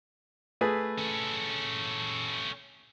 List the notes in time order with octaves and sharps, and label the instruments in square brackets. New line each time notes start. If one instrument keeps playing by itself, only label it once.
[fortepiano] A3 G#4 B4
[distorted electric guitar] C#4 A4